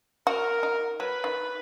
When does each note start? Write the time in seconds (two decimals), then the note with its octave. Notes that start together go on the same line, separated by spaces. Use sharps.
0.27 F#4 A#4
0.63 D#4
0.99 F#3 B4
1.24 D#3